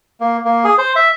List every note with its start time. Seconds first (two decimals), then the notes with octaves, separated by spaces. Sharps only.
0.20 A#3
0.45 A#3
0.64 G#4
0.78 C5
0.96 E5